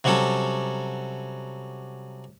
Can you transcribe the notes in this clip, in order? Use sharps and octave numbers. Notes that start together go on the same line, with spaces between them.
C3 F#3 G3 C#4 A4